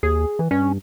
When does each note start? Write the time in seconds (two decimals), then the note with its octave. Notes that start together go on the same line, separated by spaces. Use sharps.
0.03 D#2 G#4
0.39 E3
0.51 G2 C#4